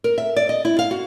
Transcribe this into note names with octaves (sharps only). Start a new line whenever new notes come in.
A#4
E5
D5
D#5
E4
F5
F#4